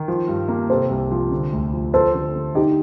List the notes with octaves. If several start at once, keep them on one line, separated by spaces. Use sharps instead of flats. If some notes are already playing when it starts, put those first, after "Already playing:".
Already playing: D#3
F3
G2
A#3
C3 A4 C5
C2
F3
D3
D2
F3
F3 A4 C5
D3
A3
D3 D#4 G4